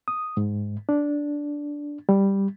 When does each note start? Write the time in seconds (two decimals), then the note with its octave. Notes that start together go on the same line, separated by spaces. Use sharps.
0.08 D#6
0.37 G#2
0.89 D4
2.09 G3